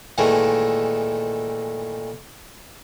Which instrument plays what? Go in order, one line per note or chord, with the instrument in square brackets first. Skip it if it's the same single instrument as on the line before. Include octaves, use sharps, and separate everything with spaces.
[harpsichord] A#2 D#3 E3 G#3 A3